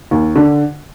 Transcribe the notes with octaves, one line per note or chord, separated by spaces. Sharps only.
D#2
D3